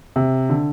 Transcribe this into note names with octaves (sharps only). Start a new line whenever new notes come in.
C3
D3